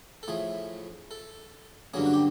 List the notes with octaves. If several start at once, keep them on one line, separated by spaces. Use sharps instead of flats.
A4
A2 F3 A3 G#4
A4
G2 D3 F#3 A#3 C#4 G#4
F#4
G4